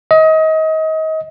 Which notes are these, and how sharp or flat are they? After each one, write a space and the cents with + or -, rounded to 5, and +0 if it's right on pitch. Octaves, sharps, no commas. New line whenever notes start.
D#5 +30